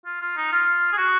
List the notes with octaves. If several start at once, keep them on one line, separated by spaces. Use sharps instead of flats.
F4
F4
D#4
F4
G#4
F#4